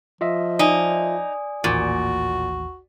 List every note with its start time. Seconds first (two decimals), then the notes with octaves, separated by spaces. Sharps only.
0.21 F3 F4 D#5 E5
0.59 D#4 D5 G#5 D#6
1.64 A1 D#2 A#2 F#4